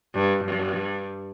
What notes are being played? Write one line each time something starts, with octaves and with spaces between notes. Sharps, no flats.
G2
G2